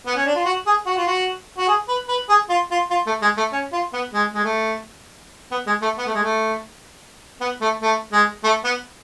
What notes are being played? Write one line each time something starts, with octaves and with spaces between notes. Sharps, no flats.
B3
C#4
D4
F4
F#4
G#4
F#4
F4
F#4
F#4
G#4
B4
B4
G#4
F4
F4
F4
A3
G#3
A3
C#4
F4
B3
G#3
G#3
A3
B3
G#3
A3
B3
A3
G#3
A3
B3
A3
A3
G#3
A3
B3